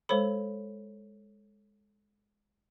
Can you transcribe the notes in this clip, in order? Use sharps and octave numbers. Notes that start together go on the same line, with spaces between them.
G#3 A4 C5 C#5 B5